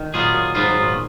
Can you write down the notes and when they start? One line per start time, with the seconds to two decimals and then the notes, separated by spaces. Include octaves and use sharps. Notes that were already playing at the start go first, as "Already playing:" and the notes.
Already playing: D#3
0.14 A#2 F#3 B3 F4 G#4
0.34 A#2
0.55 G#2 F#3 B3 F4 G#4
0.69 G#2
0.82 A#2